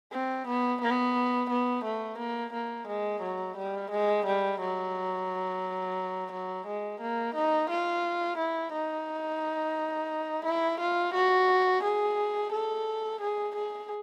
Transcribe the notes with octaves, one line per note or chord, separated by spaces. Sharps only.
C4
B3
B3
B3
A3
A#3
A#3
G#3
F#3
G3
G#3
G3
F#3
F#3
G#3
A#3
D#4
F4
E4
D#4
E4
F4
F#4
G#4
A4
G#4
G#4